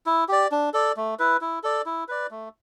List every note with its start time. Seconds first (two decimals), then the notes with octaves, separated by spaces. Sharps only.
0.06 E4
0.29 G4 D5
0.52 D4
0.74 A4 D5
0.97 A3
1.19 E4 B4
1.41 E4
1.63 A4 D5
1.86 E4
2.08 B4 D5
2.31 A3